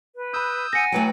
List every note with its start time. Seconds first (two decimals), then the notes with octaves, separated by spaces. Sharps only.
0.18 B4
0.34 B5 D#6 E6 F#6 G6
0.73 F#5 G#5 A#6 C#7
0.92 E3 F#3 A3 B4 G5